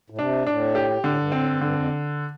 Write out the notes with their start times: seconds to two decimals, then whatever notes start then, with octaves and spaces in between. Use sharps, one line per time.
0.10 A2
0.18 C3 D4
0.46 A2 D4
0.75 G4
1.04 A2 D3
1.18 G2
1.32 A2 C4
1.46 G2
1.61 G2 D3
1.74 F2